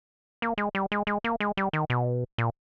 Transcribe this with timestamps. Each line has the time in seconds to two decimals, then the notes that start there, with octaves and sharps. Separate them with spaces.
0.42 A#3
0.58 G#3
0.75 G3
0.92 G#3
1.07 G#3
1.24 A#3
1.40 G#3
1.57 G3
1.73 D#3
1.90 B2
2.38 A#2